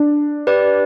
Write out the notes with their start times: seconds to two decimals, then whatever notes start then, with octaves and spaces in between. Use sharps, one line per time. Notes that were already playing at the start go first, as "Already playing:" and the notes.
Already playing: D4
0.47 G4 B4 D5